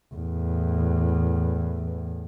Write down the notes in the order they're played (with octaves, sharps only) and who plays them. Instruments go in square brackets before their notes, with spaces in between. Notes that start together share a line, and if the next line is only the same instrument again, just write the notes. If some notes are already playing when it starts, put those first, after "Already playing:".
[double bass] E2 A2